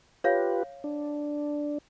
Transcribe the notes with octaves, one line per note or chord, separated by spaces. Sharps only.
F4 G4 B4 C#5 F5
D4